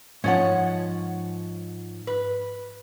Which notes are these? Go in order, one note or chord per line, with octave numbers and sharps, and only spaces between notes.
G#2 F3 C#4 C#5 F#5
B4